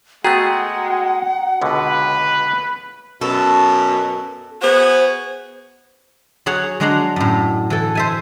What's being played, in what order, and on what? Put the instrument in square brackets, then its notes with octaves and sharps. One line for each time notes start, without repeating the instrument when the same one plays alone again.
[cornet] G#3 [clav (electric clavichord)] A3 B3 G#4 [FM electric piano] F#4 G5 A#5 [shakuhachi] F#5
[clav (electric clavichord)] C#2 B2 D3 [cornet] B4
[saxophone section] F#2 B2 [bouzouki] A4
[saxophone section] B3 F#4 G#4 [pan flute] C5
[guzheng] F#3 G#4 C#5 F#5
F#3 G#3 D4 F#5 A#5 C6
F#2 A2
E3 A4
C5 E5 G#5